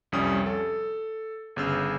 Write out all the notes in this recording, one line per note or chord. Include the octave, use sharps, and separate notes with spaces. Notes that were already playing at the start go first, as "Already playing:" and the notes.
C2 F2 G3 C#4 D#6
A4
G1 C#3 E6